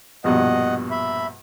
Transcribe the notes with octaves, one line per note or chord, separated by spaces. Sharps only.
A#1 G2 B2 D#5 F#5
E5 B5